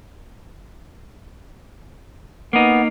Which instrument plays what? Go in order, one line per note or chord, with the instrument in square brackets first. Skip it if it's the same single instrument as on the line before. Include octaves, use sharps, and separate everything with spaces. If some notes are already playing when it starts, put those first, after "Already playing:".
[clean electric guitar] A#3 D#4 [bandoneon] B3